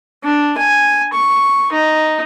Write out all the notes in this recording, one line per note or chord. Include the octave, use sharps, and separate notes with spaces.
D4
G#5
C#6
D#4